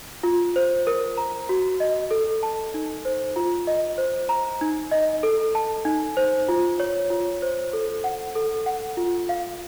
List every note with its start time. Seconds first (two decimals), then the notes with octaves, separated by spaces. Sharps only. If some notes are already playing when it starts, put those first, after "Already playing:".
0.23 F4
0.56 C5
0.87 A#4
1.18 A#5
1.49 F#4
1.80 D#5
2.11 A4
2.43 A5
2.74 D#4
3.05 C5
3.36 F4
3.67 D#5
3.98 C5
4.29 A#5
4.61 D#4
4.91 D#5
5.23 A4
5.55 A5
5.85 D#4
6.17 C5
6.48 F4
6.80 C#5
7.10 F4
7.42 C5
7.73 A4
8.04 F#5
8.35 A4
8.66 F#5
8.97 F4
9.29 F5